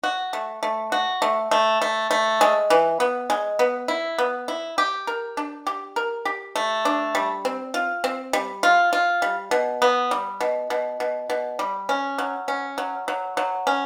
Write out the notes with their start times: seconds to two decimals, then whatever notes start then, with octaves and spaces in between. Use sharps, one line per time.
0.04 F#4
0.33 A3
0.63 A3
0.92 F#4
1.22 A3
1.51 A3
1.82 A3
2.11 A3
2.41 G#3
2.70 E3
3.00 B3
3.30 G#3
3.59 B3
3.88 E4
4.19 B3
4.48 E4
4.78 G4
5.07 A#4
5.37 D4
5.67 G4
5.96 A#4
6.25 G4
6.56 A3
6.85 D4
7.15 G3
7.45 C4
7.74 F4
8.04 C4
8.33 G3
8.63 F4
8.93 F4
9.22 G3
9.51 B2
9.82 B3
10.11 G3
10.41 B2
10.70 B2
11.00 B2
11.30 B2
11.59 G3
11.89 C#4
12.18 F#3
12.48 C#4
12.78 F#3
13.08 F#3
13.37 F#3
13.67 C#4